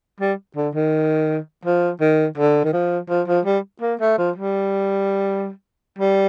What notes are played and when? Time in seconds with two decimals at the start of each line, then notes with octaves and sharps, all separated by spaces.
0.21 G3
0.57 D3
0.75 D#3
1.65 F3
2.01 D#3
2.37 D3
2.65 D#3
2.73 F3
3.09 F3
3.27 F3
3.46 G3
3.82 A#3
4.01 A3
4.18 F3
4.36 G3
5.99 G3